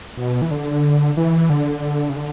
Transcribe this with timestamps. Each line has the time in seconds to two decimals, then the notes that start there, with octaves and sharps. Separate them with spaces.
0.17 B2
0.42 E3
0.51 D3
1.17 E3
1.50 D3
2.09 C#3
2.16 D3